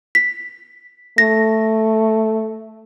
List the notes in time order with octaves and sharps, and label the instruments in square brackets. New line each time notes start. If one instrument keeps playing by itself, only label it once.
[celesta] B6
[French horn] A3 [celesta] A#6